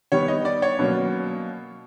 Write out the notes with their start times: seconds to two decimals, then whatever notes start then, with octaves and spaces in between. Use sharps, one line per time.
0.12 D#3 G3 B3 C#5
0.28 D#5
0.45 D5
0.62 C#5
0.79 B2 F#3 A#3 C#4